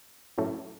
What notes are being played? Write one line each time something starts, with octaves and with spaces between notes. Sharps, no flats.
A2 F#3 A3 C#4 E4